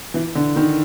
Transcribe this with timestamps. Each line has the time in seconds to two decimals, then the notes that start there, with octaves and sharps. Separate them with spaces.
0.14 E3
0.35 D3
0.56 D#3